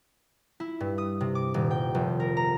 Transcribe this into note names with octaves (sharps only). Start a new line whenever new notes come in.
E4
G2
D#6
C3
D6
D#1
G5
F1
A#4
A#5